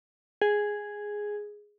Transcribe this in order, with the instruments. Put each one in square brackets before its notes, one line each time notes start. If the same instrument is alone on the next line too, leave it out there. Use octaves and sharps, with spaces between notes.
[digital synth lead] G#4